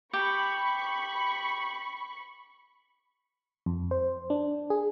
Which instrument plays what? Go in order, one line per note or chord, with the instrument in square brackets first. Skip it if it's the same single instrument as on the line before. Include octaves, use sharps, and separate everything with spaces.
[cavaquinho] G4 [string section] B5 C#6
[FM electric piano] F2
C5
D4
G#4